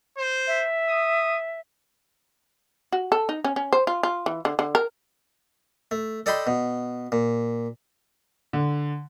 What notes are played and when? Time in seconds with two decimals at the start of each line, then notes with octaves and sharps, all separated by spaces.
0.18 C5
0.47 E5
0.88 D#6
2.92 F#4
3.12 A4
3.29 D#4
3.44 C#4
3.56 C#4
3.73 C5
3.87 F4
4.03 F4
4.26 E3
4.45 D3
4.59 D3
4.75 A#4
5.91 A3
6.26 A4 D5 D#5 G5 B5 C6
6.47 B2
7.12 A#2
8.53 D3